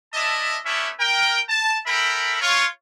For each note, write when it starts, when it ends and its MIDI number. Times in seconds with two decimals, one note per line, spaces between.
0.14 0.57 62
0.14 0.57 64
0.14 0.57 75
0.14 0.57 76
0.14 0.57 81
0.65 0.90 57
0.65 0.90 59
0.65 0.90 61
0.65 0.90 62
0.65 0.90 64
0.65 0.90 76
0.99 1.39 70
0.99 1.39 79
1.49 1.78 81
1.86 2.38 69
1.86 2.38 70
1.86 2.38 76
1.86 2.38 79
1.86 2.38 83
2.42 2.65 65
2.42 2.65 73